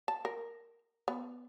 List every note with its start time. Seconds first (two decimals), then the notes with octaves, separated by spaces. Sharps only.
0.08 A5
0.25 A#4
1.08 B3